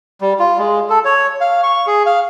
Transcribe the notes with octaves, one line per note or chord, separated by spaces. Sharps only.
G3
F4
G#3
A4
C#5
F5
C#6
G#4
F5